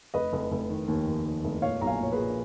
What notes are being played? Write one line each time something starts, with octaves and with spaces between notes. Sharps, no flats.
F1 B4 D#5
F1
F1
D#3
D#2
D#2
D#2
F1
A#2 C#5 F5
B1 A#5
F5 G#5
A#2 C#5
G#4 B4
A#2